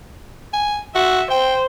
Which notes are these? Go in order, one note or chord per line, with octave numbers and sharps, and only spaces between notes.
G#5
F#4 E5
C5 G5